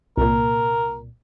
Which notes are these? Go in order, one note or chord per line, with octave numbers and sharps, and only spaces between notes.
C2 A#2 A#4